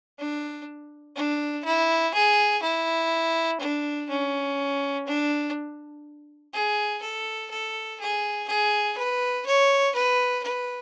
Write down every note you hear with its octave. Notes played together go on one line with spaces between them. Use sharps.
D4
D4
E4
G#4
E4
D4
C#4
D4
G#4
A4
A4
G#4
G#4
B4
C#5
B4
B4